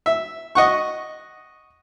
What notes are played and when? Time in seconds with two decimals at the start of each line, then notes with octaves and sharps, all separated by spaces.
0.06 E5
0.55 D#5 F#5 C#6